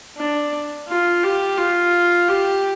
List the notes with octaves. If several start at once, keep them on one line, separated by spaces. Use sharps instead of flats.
D4
F4
G4
F4
G4